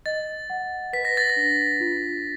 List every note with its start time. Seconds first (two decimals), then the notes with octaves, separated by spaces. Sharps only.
0.06 D#5 A6
0.50 F#5
0.93 B4 B6
1.05 A#6
1.17 A6
1.30 A#6
1.36 D4
1.80 F4